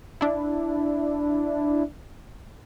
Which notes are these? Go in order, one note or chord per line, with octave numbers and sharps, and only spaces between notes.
D4 E4